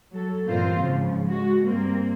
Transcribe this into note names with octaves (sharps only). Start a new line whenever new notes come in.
F#3 A4
G2 A#2 E3 C4 F4 C5
G#2 C#3 F3
G#3 F#4
G2 A#3 C4